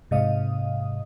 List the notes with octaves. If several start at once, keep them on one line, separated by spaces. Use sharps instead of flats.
G#2 C3 D#5 F5 D#6